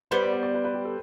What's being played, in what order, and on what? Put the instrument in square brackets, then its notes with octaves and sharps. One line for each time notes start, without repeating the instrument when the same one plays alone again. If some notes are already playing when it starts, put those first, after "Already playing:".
[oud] G3 B3 [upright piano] C5
[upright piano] D5
D5
D5
B4
B4
G4
A4